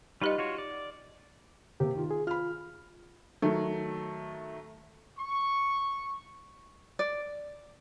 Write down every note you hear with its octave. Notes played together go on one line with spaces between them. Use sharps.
G3 D#4 F4 G4 B4 D#5
F4 F#4 C#5
D5
C3 A#3 C4 G4
D#3 F4
G#4
F4 B5 F6
D#3 F#3 A3
C#6
D5